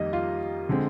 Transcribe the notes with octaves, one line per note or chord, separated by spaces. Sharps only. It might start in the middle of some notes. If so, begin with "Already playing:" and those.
Already playing: F2 D#3 G3 A#3 D#5
F4
D3 G#3 C4